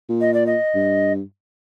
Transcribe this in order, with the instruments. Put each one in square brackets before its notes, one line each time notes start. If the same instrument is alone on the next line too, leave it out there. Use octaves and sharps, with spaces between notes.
[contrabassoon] A#2
[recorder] D#5
D5
D#5
[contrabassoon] G2